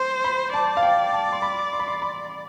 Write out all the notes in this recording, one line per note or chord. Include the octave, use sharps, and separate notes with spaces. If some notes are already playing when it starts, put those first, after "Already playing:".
Already playing: C5 C6
B5
D5 A5
F5
G5
A5
C6
B5
C6
B5
C6
B5